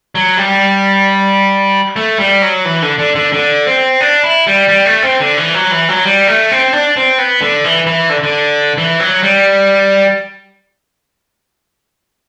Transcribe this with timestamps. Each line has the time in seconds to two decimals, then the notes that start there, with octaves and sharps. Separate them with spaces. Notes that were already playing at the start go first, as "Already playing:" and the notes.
0.15 F#3
0.37 G3
1.96 A3
2.19 G3
2.42 F#3
2.65 E3
2.82 D3
2.99 D3
3.15 D3
3.33 D3
3.67 C4
4.01 D4
4.24 E4
4.47 G3
4.68 G3
4.86 A3
5.03 C4
5.20 D3
5.37 E3
5.54 F#3
5.71 E3
5.89 F#3
6.05 G3
6.27 A3
6.51 C4
6.73 D4
6.97 C4
7.18 B3
7.41 D3
7.64 E3
7.86 E3
8.09 D3
8.23 D3
8.78 E3
9.00 F#3
9.23 G3